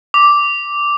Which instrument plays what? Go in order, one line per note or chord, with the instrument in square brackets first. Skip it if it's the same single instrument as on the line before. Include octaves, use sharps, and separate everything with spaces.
[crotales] D6